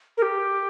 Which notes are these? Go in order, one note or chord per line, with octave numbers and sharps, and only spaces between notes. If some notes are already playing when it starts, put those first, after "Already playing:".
A#4
G4